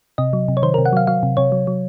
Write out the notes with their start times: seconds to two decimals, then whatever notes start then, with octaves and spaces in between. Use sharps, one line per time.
0.18 C3 D#5
0.33 F#3
0.48 C3
0.57 C#5
0.62 D#3 C5
0.74 C3 A#4
0.85 F#5
0.93 F#3 F5
1.07 F#3 F5
1.23 C3
1.37 C3 C#5
1.52 F#3
1.67 F#3